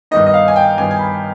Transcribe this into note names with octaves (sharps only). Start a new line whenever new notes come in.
G2 D#3 B3 D#4 D#5
D#5
F5
G#5
G5
G2 D#3 B3 D#4 G#5
G#5
B5